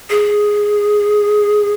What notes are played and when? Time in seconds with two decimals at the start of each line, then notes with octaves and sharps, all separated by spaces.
0.10 G#4